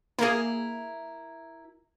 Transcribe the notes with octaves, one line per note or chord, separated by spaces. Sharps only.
A#3 E4 G#4 A#4